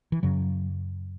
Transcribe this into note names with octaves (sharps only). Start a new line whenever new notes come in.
E3
F#2 C#3 F#3